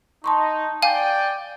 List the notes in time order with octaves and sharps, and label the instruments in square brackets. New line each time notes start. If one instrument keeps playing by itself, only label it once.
[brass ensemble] D#4 [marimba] A5 C6 C#6
[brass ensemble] D5 G5 [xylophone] F5 G#5